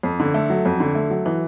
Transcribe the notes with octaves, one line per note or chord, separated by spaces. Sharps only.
F2
D3
A3
F#3
F2
D3
A3
F#3
E3